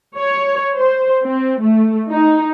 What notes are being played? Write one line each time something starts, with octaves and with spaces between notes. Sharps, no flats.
C#5
C5
C4
A3
D#4